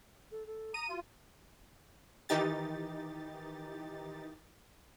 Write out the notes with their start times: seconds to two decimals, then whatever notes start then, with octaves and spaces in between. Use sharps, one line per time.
0.32 A4
0.47 A4
0.74 A#5 D#6 D#7
0.89 F4 F#4
2.29 D#3 E3 D#4 G4 A6